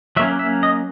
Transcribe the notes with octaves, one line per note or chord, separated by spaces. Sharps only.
F#3 A#3 C#4 E5
E5
D#5